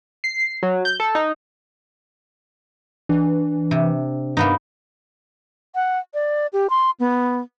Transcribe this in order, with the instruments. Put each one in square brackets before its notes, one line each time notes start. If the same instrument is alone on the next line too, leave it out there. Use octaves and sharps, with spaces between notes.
[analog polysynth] C7
F#3
G6
A4
D#4
[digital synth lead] E3 [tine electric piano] D4
[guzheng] C3
[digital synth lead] G2 [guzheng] A#3 B3 D#4
[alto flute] F#5
D5
G4
C6
B3